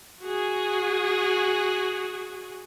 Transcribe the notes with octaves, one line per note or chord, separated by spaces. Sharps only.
F#4 G#4